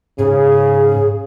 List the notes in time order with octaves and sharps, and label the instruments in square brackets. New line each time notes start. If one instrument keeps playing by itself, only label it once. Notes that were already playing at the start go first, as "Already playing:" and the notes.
[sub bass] G#2 [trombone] C#3 [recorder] G#4